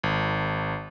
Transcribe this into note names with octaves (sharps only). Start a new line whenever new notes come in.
G#1